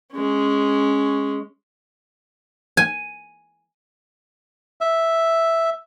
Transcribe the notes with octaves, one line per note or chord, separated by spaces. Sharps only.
G#3 C#4
G#5
E5